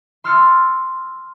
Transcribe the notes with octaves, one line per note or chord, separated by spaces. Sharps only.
C6 E6 F6 A6 C#7